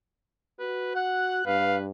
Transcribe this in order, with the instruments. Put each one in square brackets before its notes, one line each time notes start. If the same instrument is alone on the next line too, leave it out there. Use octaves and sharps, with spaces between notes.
[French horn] F#4 [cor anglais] B4
[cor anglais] F#5 [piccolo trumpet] F#6
[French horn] G2 [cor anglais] B4 [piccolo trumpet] F5